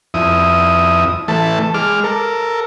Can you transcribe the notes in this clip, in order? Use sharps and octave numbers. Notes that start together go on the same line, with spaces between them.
F2 E4 D#6
E3 A3 A5
G#3 D6 F6
A4 A#4